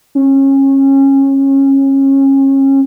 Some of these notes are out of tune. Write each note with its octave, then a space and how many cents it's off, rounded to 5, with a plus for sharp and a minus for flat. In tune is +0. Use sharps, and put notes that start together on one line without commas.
C#4 -30